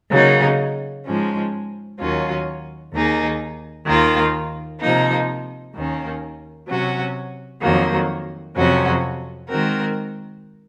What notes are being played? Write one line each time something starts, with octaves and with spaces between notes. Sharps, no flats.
C#3 F#3 A#3 D#4
G#2 F3 G#3 C#4
D#2 D#3 F#3 C#4 F4
D#2 D#3 A#3 D#4 G#4
D#2 D#3 A#3 F4
C3 F3 A#3 D#4
D#2 D#3 A#3 C#4
C3 F#3 C#4 F#4
F2 D#3 F#3 A#3
F2 C3 F#3 C#4 F#4
D#3 G#3 C4 F#4 A#4